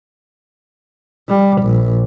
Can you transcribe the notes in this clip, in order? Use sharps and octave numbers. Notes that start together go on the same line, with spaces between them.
G3
A#1